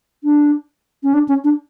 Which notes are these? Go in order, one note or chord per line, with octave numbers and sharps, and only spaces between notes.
D4
C#4
D4
C#4
D4